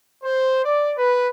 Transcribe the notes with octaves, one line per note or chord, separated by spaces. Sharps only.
C5
D5
B4